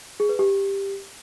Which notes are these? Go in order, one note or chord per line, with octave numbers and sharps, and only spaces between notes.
G#4
B4
G4